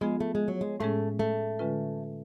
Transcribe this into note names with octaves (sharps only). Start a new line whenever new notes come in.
F3 G#3 B3 F4 G#4
A3
G#3
F#3
G#3
A2 G#3 A3 C#4 G#4
A3
D3 G#3 C#4 F4 B4